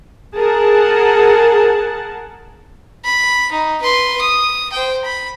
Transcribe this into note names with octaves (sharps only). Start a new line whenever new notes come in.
G#4 A#4 F#5 A5
B5
D#4
B4 C6
D#6
C5 G5
B5